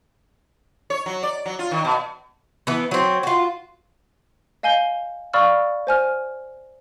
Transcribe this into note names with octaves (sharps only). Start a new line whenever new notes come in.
C#5
F#3
D5
F#3
F4
D#3
B2
E3 B3
F#3 C4
F4 F#4
D#5 F5 G#5 G6 G7
D5 F5 B5 C#6 E6 F6
C5 G#5 F6